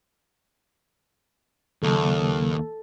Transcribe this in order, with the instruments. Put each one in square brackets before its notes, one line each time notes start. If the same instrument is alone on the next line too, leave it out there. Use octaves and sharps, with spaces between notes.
[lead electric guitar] D#2 [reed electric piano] C#3 F#3 A#3 [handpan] A4